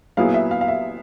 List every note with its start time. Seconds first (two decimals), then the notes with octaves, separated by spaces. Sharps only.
0.17 A#2 F#3 B3 E4 G#4 F5
0.34 E5
0.51 F5
0.61 F5
0.68 E5